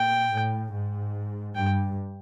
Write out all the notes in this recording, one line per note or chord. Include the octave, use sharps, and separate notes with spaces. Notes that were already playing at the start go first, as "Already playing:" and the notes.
Already playing: A#2 G5
A2
G#2
G2 G5